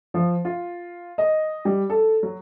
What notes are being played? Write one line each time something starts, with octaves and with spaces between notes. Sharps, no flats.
F3
F4
D#5
G3
A4
F#3